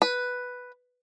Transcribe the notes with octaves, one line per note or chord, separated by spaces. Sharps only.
B4